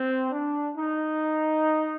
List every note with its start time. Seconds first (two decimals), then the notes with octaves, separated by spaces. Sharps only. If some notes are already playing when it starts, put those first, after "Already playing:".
Already playing: C4
0.31 D4
0.74 D#4